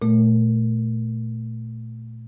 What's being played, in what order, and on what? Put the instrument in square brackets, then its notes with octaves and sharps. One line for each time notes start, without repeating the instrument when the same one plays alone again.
[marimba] A#2 A3